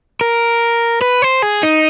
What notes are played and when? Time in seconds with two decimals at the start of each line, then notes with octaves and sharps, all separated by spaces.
0.21 A#4
1.01 B4
1.22 C5
1.42 G#4
1.63 D#4